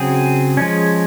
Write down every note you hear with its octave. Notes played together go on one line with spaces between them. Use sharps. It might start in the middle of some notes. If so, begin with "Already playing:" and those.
Already playing: C#3 F#3 C4 G#4
F3 G#3 C#4